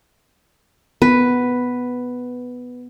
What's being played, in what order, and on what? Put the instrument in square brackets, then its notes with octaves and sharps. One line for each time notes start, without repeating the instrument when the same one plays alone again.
[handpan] B3 [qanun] B4